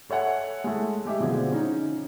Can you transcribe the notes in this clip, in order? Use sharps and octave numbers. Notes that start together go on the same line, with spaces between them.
A4 C#5 E5 F#5 G#5
G#3 A3
G#3 G4 D#5 E5
B2 D3 F3 C4 G#4
C#4 D#4